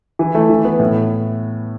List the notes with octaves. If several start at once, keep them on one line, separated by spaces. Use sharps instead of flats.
E3
A3
E3
B3
A2